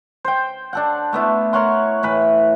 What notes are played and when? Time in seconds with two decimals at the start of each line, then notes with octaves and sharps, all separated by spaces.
0.24 C5 G5
0.73 D4 A4 F#5
1.13 A3 B3 E4
1.53 A#4 C#5 F#5 C6
2.03 A2 E3 B4